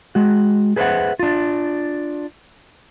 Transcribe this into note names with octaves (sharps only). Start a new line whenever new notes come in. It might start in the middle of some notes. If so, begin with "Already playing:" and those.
G#3 F#4
G#4 B4 C5 D#5 E5 F#5
D4 F4